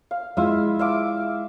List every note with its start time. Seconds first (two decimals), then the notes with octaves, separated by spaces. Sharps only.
0.11 F5
0.37 G#3 E4 F4 E5
0.79 E5 F5 D6